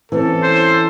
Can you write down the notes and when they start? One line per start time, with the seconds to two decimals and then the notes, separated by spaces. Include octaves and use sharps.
0.12 E3 C4 C#4 A4
0.43 C5